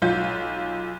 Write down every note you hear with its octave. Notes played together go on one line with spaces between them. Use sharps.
B1 F4 G6